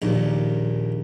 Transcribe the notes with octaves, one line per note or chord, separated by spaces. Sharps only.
A#1 D#2 A#2